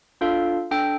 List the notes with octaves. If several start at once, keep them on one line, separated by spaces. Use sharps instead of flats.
D4 F4 A4 F5
D4 A4 G5